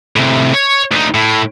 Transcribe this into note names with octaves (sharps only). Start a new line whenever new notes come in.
A2 C3
C#5
D2 D#4
A2